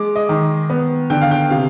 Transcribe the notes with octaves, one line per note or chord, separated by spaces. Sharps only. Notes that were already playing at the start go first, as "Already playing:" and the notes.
Already playing: G#3 D6
D#5
D#3
B3
D3 G5
F5
G5
C3 F5